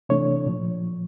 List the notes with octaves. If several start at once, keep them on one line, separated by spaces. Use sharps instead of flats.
C3 E3 A3 D4 C#5
A#2 F3